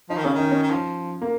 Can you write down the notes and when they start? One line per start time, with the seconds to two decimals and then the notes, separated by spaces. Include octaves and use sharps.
0.09 F3 D#4
0.17 D#3
0.25 C#3 C#4
0.34 D#3 D#4
0.51 C#4
0.63 D#3
0.71 F3
1.22 A#3